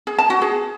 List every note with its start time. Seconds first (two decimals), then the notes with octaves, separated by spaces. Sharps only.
0.07 G#4
0.18 A5
0.30 F#4
0.42 G#4